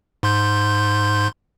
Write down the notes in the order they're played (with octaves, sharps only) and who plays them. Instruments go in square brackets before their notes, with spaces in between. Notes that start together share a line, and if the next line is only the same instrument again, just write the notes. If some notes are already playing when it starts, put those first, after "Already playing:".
[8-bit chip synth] G#2 C6 G6